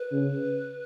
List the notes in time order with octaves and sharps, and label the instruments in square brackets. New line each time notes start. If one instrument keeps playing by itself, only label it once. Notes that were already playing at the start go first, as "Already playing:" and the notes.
Already playing: [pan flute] B4
[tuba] C#3